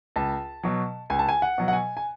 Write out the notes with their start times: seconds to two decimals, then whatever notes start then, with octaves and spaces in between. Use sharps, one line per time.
0.16 C#2 A5
0.63 B2 F#3
1.10 C#2 G#5
1.19 A5
1.29 G#5
1.42 F#5
1.58 B2 F#3
1.68 F#5
1.73 G#5
1.97 G#5